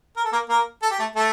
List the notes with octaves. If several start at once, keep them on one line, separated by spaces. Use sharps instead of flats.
A#4
A4
A#3 A#4
A#3 A#4
A4
G4
A3 A4
A3 A4